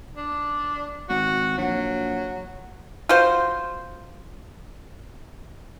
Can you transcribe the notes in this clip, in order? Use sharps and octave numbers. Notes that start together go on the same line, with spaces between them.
D4
G#1 F#4
A#1 F#3
F4 F#4 C5